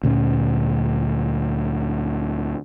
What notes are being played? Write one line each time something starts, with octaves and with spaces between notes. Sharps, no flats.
D2 A#2 B3 C#4